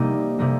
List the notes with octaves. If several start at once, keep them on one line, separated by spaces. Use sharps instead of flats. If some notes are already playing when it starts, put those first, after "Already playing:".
Already playing: C3 G3 A#3 D#4
C3 G3 A#3 D#4